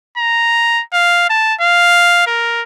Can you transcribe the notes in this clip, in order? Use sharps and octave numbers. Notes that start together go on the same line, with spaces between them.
A#5
F5
A5
F5
A#4